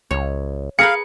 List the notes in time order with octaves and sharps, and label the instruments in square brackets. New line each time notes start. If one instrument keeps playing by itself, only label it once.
[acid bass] C#2 [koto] C#5
[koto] G#4 A#4 B4 [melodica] F5 [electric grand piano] C#7